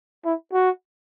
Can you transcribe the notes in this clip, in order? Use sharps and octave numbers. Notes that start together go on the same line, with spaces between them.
E4
F#4